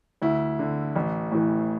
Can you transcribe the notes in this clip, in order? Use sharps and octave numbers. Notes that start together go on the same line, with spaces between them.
D2 E4
D3
A1
A2 E3